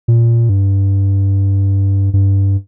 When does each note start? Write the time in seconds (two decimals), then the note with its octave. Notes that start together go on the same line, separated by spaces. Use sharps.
0.08 A#2
0.49 G2
2.14 G2